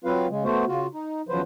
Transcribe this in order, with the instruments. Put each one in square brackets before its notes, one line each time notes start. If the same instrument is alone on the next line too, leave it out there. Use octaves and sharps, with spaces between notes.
[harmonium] F#3 C4 F4 B4 F5
C#3 G#3
A3 B3 F#4 C5
C#3 F4 F#4
D#4
E2 C#3 F3 F#3 B4 C5